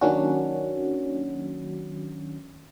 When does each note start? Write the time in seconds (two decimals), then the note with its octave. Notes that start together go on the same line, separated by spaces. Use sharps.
0.01 D#3 F#3 A#3 C#4 D4 F#4